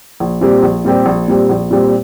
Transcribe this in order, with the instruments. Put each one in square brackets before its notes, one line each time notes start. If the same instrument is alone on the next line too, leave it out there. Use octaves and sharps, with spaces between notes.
[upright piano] A#1
A#2 G3 C4 G4
A#1
A#2 G3 C4 G4
A#1
A#2 G3 C4 G4
A#1
A#2 G3 C4 G4